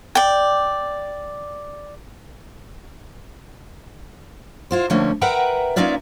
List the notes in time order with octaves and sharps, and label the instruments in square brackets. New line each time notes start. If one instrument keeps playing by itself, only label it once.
[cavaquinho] D5 G5
[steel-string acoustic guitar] E4 F4 C5
D3 F3 A3 A#3 C#4
A#4 B4 E5 F#5 G5 A#5
A#3 C#4 D#4 F4 D5 E5